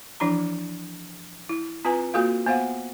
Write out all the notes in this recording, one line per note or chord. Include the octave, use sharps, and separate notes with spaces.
E3 F3 D4 E4 A#5
E4
C4 F4 B4 G#5 A#5
A#3 F4 F#4 A4 F5
B3 C5 F5 F#5